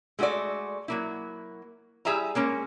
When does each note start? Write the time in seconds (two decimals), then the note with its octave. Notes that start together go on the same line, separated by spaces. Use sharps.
0.19 G#3 A3 F#4 A4 D5
0.88 F#3 A#3 E4
2.05 G3 E4 G#4 E5 G#5 A#5
2.35 G#3 A#3 C#4